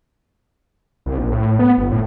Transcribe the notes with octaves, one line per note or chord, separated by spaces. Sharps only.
C2
A#1
A2
B3
G1
A2